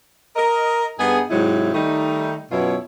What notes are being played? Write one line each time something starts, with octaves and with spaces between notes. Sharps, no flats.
A#4 D#5
G2 B3 D#4 G#4
G#2 C3 F#3 D#4 E4
D#3 G3 A3 D#4
F#2 B2 B3 E4 F4 C#5